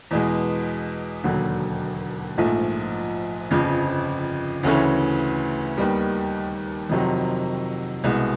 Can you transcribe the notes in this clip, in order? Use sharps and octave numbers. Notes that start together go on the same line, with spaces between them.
E2 B2 G#3
E1 D#2 D3 F#3
A#1 G#2 F3 A3
G1 F2 C#3 F3
D2 C#3 E3 A3 C#4
D#2 D#3 G3 B3
F2 C3 D#3 F#3
C2 B2 G#3